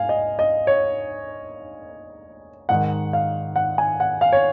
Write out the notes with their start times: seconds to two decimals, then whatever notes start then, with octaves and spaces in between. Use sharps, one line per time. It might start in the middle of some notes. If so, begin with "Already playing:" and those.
Already playing: G#2 F5 G#5
0.09 D#5
0.39 D#5
0.67 C#5
2.69 G#2 D#3 F#5
3.13 F5
3.56 F#5
3.78 G#5
4.00 F#5
4.21 F5
4.32 C#5